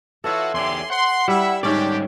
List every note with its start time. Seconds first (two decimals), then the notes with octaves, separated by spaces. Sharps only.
0.24 E3 F4 F#4 A4 C#5 E5
0.54 E2 G4 D5 G#5 C6
0.90 F#5 C6
1.28 G3 E4 E5
1.63 G#2 D3 D#3 G3 C#4 D4 G4 D5